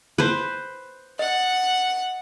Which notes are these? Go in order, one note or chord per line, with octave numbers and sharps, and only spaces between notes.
B4 C5
D#5 F#5